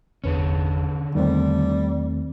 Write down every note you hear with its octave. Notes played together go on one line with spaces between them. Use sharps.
G1 E2 D3 C#4 B4
E2 D#3 G3 A3 C4